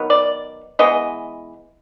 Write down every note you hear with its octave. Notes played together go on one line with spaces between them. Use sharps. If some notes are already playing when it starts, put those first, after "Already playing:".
Already playing: D#3 F#3 B3
D5
E3 G#3 B3 D#5